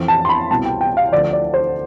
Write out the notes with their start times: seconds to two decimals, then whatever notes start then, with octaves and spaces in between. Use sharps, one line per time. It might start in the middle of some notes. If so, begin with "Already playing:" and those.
Already playing: F2 E3
0.08 A5
0.25 C6
0.29 B5
0.51 C2 B2 A5
0.66 G5
0.81 G5
0.97 F5
1.12 D2 D3 F3 D5
1.33 D5
1.54 C5